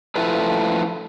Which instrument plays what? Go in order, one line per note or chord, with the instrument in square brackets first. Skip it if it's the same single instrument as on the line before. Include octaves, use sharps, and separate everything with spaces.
[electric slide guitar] F3 A3 E4 F4 A4 B4